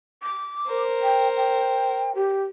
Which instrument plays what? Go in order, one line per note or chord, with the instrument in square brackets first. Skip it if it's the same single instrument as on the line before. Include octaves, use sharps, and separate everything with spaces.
[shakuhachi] D6
[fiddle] A#4 C5
[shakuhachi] G5
G5
G4